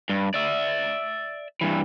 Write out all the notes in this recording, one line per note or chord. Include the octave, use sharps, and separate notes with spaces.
G2
D5 E5
G2 E3